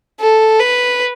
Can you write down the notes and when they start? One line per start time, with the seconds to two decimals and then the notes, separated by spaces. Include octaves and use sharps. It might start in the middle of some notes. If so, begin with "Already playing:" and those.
0.20 A4
0.59 B4